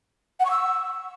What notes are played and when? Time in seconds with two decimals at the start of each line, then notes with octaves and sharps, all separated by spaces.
0.40 F#5
0.45 C#6
0.51 E6